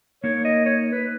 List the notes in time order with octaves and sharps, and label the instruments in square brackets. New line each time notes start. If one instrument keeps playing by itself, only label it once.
[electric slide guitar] A#3 D#4 A#4 [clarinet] C#5
[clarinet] D#5
C#5
B4